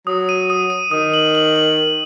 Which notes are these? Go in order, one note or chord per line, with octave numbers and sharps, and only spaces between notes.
F#3 D#6
D#7
D#6
D#7
D#3 D#6
F#7
F#7
F#7
F#7